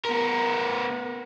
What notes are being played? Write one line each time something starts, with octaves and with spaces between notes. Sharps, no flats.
B3 A#4